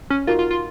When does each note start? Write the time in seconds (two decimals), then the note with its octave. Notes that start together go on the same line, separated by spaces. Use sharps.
0.10 C#4
0.27 D#4 F4 F#4 A#4 F5
0.39 F4
0.51 F4